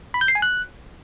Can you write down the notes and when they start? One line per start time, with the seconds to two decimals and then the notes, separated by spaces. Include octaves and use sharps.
0.14 B5
0.21 G6
0.28 C7
0.35 G#5
0.42 F#6